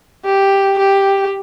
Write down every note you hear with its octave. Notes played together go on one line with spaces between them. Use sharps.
G4
G4